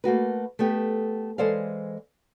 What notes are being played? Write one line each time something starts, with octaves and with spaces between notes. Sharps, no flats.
A3 A#3 F#4 B4
A3 B3 G4 A4
E3 G#3 A4 C5 D5 F5